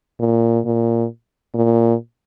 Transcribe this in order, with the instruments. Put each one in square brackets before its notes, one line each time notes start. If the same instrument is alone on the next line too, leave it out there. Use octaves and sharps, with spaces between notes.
[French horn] A#2
A#2
A#2